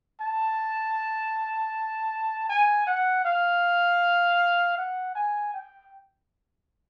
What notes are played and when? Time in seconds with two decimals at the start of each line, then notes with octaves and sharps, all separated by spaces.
0.21 A5
2.49 G#5
2.87 F#5
3.25 F5
4.77 F#5
5.15 G#5
5.53 G5